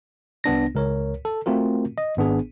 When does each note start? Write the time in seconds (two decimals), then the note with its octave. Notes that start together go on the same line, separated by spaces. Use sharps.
0.44 C2 B3 D4 A#6
0.75 C#2 A#4 C#5
1.25 A4
1.46 A3 C4 F4 F#4 A#4
1.98 D#5
2.17 G#1 B3 D4 G#4